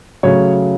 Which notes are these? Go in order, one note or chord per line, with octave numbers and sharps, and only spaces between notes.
C#3 F#3 A3 C#5